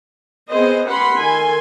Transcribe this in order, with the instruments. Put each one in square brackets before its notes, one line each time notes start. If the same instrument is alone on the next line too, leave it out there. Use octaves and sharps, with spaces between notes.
[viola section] B3 C4 G#4 C5 D#5
C#4 G4 B4 F#5 B5 C6
D#3 A4 G#5 C6